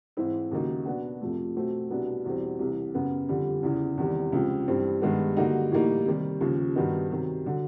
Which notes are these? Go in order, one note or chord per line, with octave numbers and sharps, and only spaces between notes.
G#2 E3 G#3 C4 E4
D#2 C#3 F#3 A#3 D#4
B2 F#3 B3 D4 F#4
F2 C3 F3 A3
B2 F#3 A3 C4
C2 B2 F#3 B3 D4
E2 B2 G3 C4
C2 C3 E3
F#2 C#3 F#3 B3
F2 D3 G3
E2 C#3 E3
E2 C3 D#3 G3
C#2 C3 F3
G2 E3 G3 C4
G2 D#3 G#3 B3
D3 G3 A#3 D#4 F#4
A2 E3 G3 A#3 D#4
C3 D#3 G3
D#2 C#3 F3
G2 D#3 F#3 B3 D#4
C3 D#3 F#3
D3 F#3